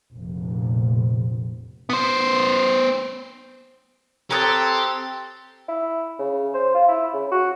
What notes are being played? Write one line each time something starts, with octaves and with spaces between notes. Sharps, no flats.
F1 A#1
B3 C5
C4 G4 A4 C#5 A#5 D#6 F#6 A6
E4
C#3
C5
F4
E4
C#3
F#4